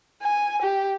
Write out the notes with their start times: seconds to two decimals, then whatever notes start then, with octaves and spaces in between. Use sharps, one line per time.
0.22 G#5
0.62 G4